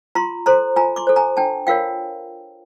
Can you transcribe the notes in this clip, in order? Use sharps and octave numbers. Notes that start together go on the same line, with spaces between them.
F4 A#5 C6
A4 C5 A#5 C6
F4 G#5 A#5
C6 D6
A4 C5
G#5 A#5
D4 G5 A5
F4 A#4 C#5 F5 G5